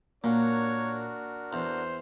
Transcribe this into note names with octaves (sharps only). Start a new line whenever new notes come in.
A#2 A#3 D4 F#4 A#4 C#5
E2 C5